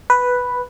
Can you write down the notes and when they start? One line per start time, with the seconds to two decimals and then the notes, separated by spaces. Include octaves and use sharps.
0.10 B4